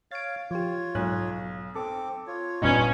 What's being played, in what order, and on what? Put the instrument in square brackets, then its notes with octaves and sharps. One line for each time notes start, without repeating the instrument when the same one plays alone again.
[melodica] C#5 F5 [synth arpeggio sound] A6 D7
[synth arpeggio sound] F3 G4 [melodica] F4 C#5
[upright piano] B1 [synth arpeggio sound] G#2 F#6
[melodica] C4 D6 [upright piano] A4
[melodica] F4 C#5
[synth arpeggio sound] G1 E2 A#2 [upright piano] G2 B3 D#4 [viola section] C#4